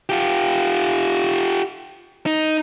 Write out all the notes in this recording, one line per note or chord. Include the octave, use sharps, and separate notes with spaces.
F4 G4
D#4